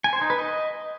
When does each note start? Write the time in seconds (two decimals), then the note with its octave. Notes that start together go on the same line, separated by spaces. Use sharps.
0.04 G#5
0.13 C5
0.21 D#4
0.30 B4
0.38 D#5